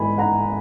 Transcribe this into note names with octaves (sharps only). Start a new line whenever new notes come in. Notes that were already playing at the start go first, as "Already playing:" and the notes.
Already playing: G#2 E3 G#3 B3 G#5 B5
F#5 A#5